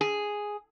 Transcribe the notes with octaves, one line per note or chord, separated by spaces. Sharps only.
G#4